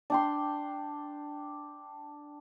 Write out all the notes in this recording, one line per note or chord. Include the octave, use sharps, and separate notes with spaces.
D4 G5 C6